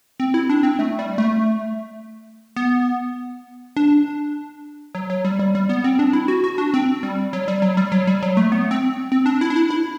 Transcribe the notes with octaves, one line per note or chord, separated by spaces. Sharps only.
C4
E4
D4
C4
A3
G3
A3
B3
D4
F#3
F#3
G3
G3
G3
B3
C4
D4
E4
F#4
F#4
D4
C4
G3
F#3
G3
F#3
G3
F#3
G3
F#3
A3
B3
C4
C4
D4
E4
D4
E4
E4